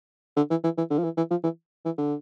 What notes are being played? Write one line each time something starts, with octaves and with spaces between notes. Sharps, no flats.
D3
E3
E3
E3
D3
F3
E3
E3
F3
E3
E3
D3